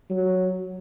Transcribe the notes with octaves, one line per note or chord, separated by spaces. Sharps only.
F#3